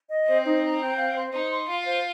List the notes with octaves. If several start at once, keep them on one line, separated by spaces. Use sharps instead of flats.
D#5
C4 C5
D#4
A#5
G5
F5
C5
D#4 C5
C6
F4 F5
C5